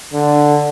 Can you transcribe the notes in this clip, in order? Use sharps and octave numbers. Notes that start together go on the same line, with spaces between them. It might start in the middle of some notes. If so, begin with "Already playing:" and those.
D3